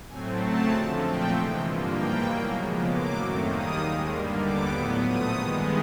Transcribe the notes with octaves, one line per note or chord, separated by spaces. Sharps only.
A2 F#3 A3 C4 G#5
C#3 F#3 A3 C4 A5
F2 D3 F3
A#2 F3 A3 C4 G5
C3 E3 G#3
G2 D3 F3 A#3 D#5
G#2 E3 G3 A#3 G5
B2 F#3 A#3
C#3 F3 G#3 B3
A2 F#3 A#3 D6
F#2 D#3 F#3 A3 C4
D#2 D#3 G3 A#3 D#6
D#2 D#3 G#3
G2 D3 G3 A#3
D#2 D3 G3 B3 D6
A2 F#3 B3
A#2 F3 A3 D#6
G2 D#3 G#3 B3